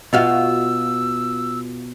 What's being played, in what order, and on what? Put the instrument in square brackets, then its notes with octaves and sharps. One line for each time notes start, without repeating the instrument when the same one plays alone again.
[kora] B2 [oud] F4 F#4 F5 [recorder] E6